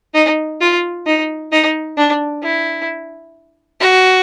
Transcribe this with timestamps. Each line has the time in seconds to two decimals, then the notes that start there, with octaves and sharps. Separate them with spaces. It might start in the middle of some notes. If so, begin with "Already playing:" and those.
0.14 D#4
0.61 F4
1.06 D#4
1.52 D#4
1.98 D4
2.43 E4
3.80 F#4